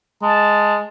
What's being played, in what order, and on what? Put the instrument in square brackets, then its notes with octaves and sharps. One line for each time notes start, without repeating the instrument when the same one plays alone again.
[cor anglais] G#3 [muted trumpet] A5